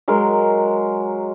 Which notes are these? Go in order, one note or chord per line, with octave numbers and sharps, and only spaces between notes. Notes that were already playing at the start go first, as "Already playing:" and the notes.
F#3 G#3 A#4